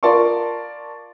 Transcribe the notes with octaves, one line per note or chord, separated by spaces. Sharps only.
F4 A#4 D5 A5 C6 C#6